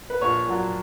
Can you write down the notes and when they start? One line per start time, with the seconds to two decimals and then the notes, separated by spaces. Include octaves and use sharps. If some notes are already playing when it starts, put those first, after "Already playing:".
0.10 B4
0.21 A#1 C#5
0.46 A#2 F#3